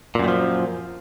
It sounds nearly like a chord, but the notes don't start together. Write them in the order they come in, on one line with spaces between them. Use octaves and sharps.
A#2 F#2 D#3 F3